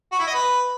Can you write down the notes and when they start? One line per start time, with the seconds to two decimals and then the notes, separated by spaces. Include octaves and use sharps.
0.12 F#4
0.19 E4
0.27 D#5
0.34 B4